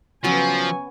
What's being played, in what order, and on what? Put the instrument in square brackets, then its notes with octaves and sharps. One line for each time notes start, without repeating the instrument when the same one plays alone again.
[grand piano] C#3 F#3 [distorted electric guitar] F3 [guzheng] B3 C#4 [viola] G#5 C#6